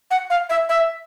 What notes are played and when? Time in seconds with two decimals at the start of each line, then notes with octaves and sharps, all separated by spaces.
0.11 F#5
0.30 F5
0.50 E5
0.69 E5